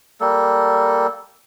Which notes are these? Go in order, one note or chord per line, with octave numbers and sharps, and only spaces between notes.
G3 A#3 A4